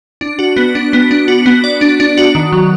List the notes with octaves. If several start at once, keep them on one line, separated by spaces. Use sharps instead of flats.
D4
F#4
B3
D4
B3
D4
F#4
B3
D5
D4
D4
F#4
D#3
F#3